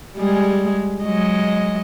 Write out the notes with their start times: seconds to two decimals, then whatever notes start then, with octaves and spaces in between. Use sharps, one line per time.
0.16 G3 G#3 G#4
1.04 F#3 G#3 D#5